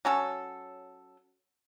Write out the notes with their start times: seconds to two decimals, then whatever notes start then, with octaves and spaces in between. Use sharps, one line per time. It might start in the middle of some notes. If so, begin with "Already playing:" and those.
0.05 F#3 C#4 A4